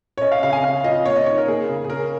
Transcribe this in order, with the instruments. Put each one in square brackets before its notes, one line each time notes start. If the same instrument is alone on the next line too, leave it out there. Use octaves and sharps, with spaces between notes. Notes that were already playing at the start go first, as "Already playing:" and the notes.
[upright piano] C#5
C#4 D#5
F5
C#3 F5
G#5
C#4 F5
F4 D#5
A#3 C#5
D#5
D#4 C#5
A#4
A#3 G#4
C#3
G#4
C#4 A#4